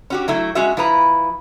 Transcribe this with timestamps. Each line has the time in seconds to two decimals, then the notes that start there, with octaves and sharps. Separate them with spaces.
0.10 C#4 F#4 G4
0.28 F#3 A3 E4
0.55 G#3 C#4 F#4 E5
0.77 F3 E4 B4 A#5